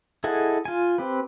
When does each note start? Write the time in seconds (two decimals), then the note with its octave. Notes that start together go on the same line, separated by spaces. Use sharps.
0.24 E4 G#4 A4 D#5 F#5
0.65 F4 G#5
0.98 C4 G4 B4